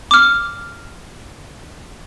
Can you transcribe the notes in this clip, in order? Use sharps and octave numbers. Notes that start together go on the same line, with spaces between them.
D6 F6